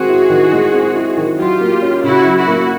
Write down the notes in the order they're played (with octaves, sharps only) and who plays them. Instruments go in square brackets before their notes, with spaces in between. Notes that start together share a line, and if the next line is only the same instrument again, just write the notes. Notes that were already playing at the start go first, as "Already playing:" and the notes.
Already playing: [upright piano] D#3 G#3 C4 [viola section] F#4 G#4
[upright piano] E4
D#3
G#3
C4
E4
D#3
[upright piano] F#3 [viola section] F4 G4
[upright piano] A#3
C#4
[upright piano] C#3 [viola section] E4 F#4
[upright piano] F#3
[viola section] E4 F#4
[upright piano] A#3